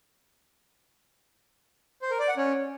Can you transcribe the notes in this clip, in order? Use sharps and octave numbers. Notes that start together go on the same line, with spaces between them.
C5
A#4
D5
F#5
C#4